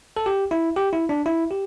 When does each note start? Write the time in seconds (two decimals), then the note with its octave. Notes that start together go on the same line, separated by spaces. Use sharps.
0.17 A4
0.26 G4
0.51 E4
0.76 G4
0.93 E4
1.09 D4
1.26 E4
1.51 G4